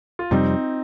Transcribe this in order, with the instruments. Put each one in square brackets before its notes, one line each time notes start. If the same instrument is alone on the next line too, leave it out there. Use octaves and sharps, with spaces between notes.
[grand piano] F4
[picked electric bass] F2 C3 G3 [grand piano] C4 D#4